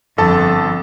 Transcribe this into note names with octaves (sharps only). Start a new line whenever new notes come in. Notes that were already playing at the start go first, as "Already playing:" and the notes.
G1 F2 A4 A5